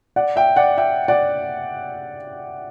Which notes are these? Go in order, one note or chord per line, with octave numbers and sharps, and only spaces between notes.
D5 F#5
E5 G5
D5 F#5
E5 G5
D5 F#5